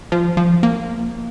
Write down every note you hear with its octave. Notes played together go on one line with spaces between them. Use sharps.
F3
F3
A#3